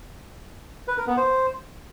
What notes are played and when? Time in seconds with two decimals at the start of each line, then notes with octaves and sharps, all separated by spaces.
0.88 B4
0.97 A#4
1.07 B3
1.17 C5